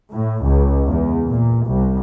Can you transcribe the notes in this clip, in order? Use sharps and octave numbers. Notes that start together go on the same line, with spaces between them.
A2
C#2
E2
A#2
C2